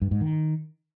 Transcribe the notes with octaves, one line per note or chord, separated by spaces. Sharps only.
G2
G#2
D#3